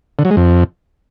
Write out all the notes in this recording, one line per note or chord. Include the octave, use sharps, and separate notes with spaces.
D3
F#3
G#3
F2